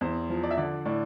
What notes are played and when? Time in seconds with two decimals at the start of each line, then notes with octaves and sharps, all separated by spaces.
0.01 E2 C5
0.29 F3
0.43 D5
0.51 E5
0.57 D3 D5
0.85 A2 D5